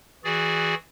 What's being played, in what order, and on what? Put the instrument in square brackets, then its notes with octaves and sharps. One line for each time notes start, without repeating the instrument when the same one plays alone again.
[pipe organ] E3 F#4 G#4 D5